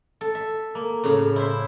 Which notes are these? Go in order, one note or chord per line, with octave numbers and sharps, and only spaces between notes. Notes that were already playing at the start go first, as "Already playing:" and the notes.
A4
E5
A#3
A2 C#3
E4 C5 E5